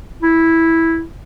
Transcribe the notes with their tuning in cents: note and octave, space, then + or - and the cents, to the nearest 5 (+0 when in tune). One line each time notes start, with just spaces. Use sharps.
E4 -5